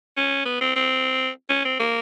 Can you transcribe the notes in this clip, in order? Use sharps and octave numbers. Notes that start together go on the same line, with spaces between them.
C#4
B3
C4
C4
C#4
C4
A#3